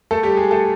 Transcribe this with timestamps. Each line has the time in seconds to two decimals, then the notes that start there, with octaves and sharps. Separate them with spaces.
0.11 A3 A4
0.23 G3 G4
0.37 G#3 G#4
0.51 A3 A4